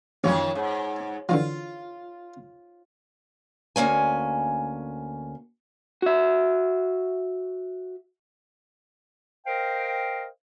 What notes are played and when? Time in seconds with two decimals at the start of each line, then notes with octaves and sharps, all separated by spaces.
0.24 A1 F#2 D#3 F3 C#4 C#5
0.55 G#2
1.29 D3 E3 F#3 F4
3.76 D2 A#3 C#4 G#5
6.02 F#4 E5
9.46 A#4 C5 D#5 F5 G5